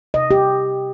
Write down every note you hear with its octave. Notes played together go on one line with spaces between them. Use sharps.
C3 D#5
G4